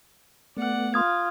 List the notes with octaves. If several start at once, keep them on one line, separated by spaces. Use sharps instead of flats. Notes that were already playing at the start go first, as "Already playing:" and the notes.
A3 B3 D5 F#5
F4 F5 C6 D#6 G#6